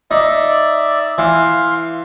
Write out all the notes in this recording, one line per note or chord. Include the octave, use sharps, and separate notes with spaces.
D#4 D5 E5
E3 F5 C6